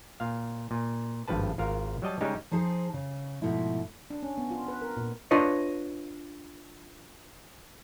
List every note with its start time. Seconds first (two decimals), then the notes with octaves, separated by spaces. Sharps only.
0.20 A#2 F5
0.71 A#2
1.28 G#1 G2 F3 B4 A5
1.58 G#1 F4 A#4 F5
2.02 F#3 G3 D#5 A5
2.21 C#3 G3 G#3 D#4 G4
2.51 F3 D#4 G#4 C5 A5
2.94 C#3
3.42 G#2 B2 F3 A3 E4
4.10 D4
4.23 C#4
4.38 B3
4.51 F4
4.68 B4
4.82 A#4
4.97 A#2
5.31 D4 F4 B4 C#5 D#5